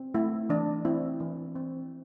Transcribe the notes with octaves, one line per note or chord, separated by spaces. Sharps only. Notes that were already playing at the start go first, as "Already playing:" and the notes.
Already playing: C4
A3 E4
E3 D4
C4 E4
E3
C4